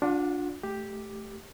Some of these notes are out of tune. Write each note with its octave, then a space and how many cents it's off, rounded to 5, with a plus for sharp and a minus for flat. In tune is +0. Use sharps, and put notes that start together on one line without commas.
D4 -5 F4 +35 F#5 +0
A3 -15 G4 +0